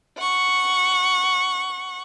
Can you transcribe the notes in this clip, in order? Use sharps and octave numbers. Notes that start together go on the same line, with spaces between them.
F#5 C#6